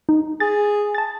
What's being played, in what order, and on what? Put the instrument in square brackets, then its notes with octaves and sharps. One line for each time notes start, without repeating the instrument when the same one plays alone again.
[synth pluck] D#4
[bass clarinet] G#4 [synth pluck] A6
[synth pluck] A5 A6